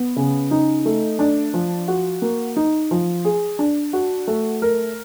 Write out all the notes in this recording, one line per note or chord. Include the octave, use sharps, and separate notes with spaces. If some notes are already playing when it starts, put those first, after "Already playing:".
Already playing: B3
C#3
D#4
A3
D4
F3
F#4
A#3
D#4
F3
G#4
D4
F#4
A3
A#4